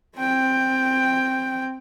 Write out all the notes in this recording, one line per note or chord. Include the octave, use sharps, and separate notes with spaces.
C4 G5